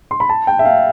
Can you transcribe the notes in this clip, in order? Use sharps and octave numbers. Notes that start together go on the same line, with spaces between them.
C6
B5
A5
G5
E5
F5